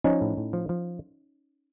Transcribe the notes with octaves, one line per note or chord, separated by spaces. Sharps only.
F3 C#4 D#4
A2
A2
F3
F3